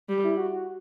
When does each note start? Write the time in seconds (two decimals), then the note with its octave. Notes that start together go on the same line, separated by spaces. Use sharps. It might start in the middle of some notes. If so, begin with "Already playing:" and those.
0.09 G3
0.24 E4
0.37 F#4
0.52 F#4